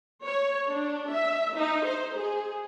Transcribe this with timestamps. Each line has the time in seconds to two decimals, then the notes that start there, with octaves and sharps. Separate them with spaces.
0.24 C#5
0.71 D4
1.12 E5
1.57 D#4
1.86 C5
2.17 G#4